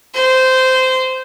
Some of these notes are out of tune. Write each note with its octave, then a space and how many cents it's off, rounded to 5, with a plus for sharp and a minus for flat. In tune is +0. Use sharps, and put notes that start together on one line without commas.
C5 -15